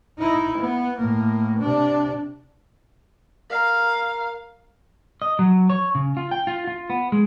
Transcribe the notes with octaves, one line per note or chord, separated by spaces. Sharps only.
D#4 E4
B3
A2 A#3
C3 D4
A#4 F5 A#5
D#5
F#3
C#5
C#3
F4
G5
F4
F4
B3
G#3